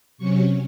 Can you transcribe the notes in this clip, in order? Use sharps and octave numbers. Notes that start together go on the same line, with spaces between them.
C3 F#3 C#4 C#6